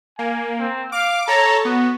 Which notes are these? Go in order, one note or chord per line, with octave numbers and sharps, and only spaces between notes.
A#3 G#5
C4
F5 D6
A4 C#5 A5 A#5
B3 F#4